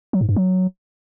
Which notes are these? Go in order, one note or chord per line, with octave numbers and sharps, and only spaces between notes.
F#3
G#2
G2
F#3